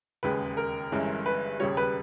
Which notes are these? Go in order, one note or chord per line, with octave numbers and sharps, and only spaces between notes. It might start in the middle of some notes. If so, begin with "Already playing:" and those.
E1 D#2 C#3 G#3 B4
A#4
G1 G2 E3 G#3 C#4
B4
E1 D#2 C#3 G3 C#5
B4